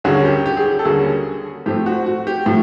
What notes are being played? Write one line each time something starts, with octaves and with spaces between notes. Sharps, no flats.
D#2 D3 G3 A#3 C#4 F#4 G#4
G4
G4
G#4
G4
A4
D#2 D3 G3 A#3 C#4 F#4 G#4
A2 F3 A3 C4 G4
F#4
F#4
G4
A2 F3